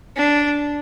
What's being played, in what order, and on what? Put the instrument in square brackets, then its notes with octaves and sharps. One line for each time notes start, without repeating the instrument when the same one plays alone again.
[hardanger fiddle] D4